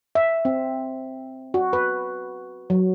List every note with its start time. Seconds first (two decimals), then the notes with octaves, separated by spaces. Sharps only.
0.15 E5
0.45 C4
1.54 F#4
1.73 B4
2.70 F#3